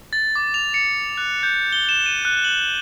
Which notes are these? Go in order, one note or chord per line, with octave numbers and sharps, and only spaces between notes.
A6
D6
F7
C#7
F#6
G6
G7
E7
D#7
F#6
F#7